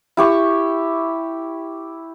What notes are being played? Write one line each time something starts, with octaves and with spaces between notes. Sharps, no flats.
E4 G4 C#6